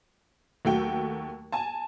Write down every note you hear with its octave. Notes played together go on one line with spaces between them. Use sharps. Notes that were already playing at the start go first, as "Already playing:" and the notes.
D#2 F#3 A3 F#4 G5
G#5 A5